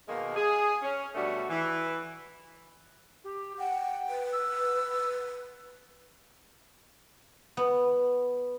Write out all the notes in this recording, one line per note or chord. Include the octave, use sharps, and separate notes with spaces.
B2 D#3 G#3 A#3
G#4
C#4
B2 G3 A3 D4 F#4
E3
G4
F#5 G5
B4
E6
B3